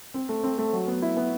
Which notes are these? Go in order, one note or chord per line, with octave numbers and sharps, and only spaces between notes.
C4
A3
C4
A3
F#3
B3
E4
B3